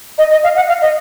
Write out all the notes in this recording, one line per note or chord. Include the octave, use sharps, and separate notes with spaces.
D#5
D#5
F5
F#5
F5
D#5